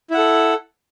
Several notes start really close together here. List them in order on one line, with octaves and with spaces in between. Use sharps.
E4 F#5 A4